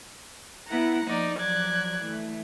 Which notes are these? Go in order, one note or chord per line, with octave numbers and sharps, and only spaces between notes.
B3 E4 F#5 A#5
F3 A#3 D#4 D5
F3 F#3 D5 F#6 G#6
E3 A3